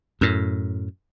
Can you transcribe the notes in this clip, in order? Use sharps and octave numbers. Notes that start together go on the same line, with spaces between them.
F#2 A2